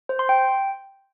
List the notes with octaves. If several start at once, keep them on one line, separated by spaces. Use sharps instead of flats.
C5
C6
G5